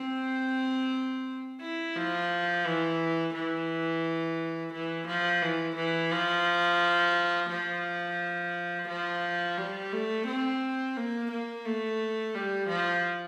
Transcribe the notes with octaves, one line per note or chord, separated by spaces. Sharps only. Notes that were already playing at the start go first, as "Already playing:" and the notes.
Already playing: C4
E4
F3
E3
E3
E3
F3
E3
E3
F3
F3
F3
G3
A3
C4
A#3
A#3
A3
G3
F3